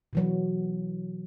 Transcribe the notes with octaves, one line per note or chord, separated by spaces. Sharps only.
B2 E3 F#3